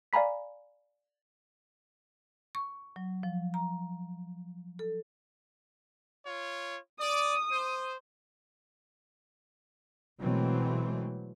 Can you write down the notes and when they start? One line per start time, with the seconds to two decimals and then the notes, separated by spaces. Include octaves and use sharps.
0.13 D5 F5 G#5 A#5 B5 B6
2.55 C#6
2.96 F#3
3.23 F3
3.54 A#5
4.79 A4
6.26 F4 C#5
6.99 D5 D#6
7.50 C5
10.20 B2 E3 F#3 G#3 A3 C4